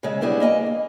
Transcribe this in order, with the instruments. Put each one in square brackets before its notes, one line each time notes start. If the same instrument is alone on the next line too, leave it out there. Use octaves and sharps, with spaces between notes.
[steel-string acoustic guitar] C#3 G#3 E5
G3 B3 D4 E4 G#4
A#3 D#5 E5 G#5
A#3